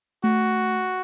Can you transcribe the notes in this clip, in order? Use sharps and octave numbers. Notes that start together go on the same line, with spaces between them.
A3 F#4